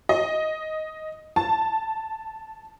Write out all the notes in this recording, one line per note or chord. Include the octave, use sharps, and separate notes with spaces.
D#5
A5